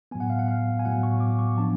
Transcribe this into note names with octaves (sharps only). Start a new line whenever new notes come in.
A2 F#3 B3 G#5
F#5
F5
F#5
F5
G#5
A2 F#3 B3 F#5
C#6
D6
C#6
F3 B3 D4 A5